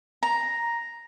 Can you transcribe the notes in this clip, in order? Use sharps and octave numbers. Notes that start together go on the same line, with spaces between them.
A#5